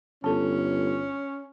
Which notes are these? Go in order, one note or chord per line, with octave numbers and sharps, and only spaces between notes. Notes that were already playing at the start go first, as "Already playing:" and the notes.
G1 C#4 A4 A5